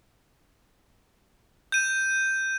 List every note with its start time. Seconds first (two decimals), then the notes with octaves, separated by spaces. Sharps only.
1.72 G6 D#7